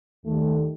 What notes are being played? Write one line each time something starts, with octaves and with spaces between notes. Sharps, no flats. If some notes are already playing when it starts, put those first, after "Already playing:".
D#2 D#3 G3 A3